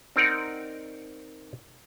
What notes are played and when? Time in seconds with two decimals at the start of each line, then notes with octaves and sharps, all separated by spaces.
0.16 C4 D#4 A#4 D5 F#5